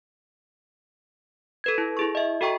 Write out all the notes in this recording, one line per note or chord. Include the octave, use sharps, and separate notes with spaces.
A4 B4 G#6
E4
E4 G#4 C#6
D#5 E5
F#4 A4 E5 G5 A#5 C#6